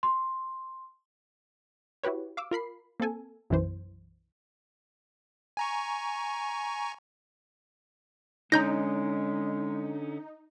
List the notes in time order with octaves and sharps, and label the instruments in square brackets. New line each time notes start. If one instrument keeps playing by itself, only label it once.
[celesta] C6
[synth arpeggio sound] E4 F#4 G4 B4 C#5
F5 D6 E6
F4 A#4 B5 C7
A#3 C4 A4 G#5
B1 F#2 E3 C5
[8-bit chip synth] G#5 A#5 C#6
[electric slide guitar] D3 C#4 [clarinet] G#3 [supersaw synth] D#4 [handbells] A#5 G6 A#6